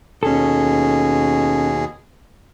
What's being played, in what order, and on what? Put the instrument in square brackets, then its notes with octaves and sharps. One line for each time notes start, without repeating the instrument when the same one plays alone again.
[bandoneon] D#2 B2 G#4 [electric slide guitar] C#4 A4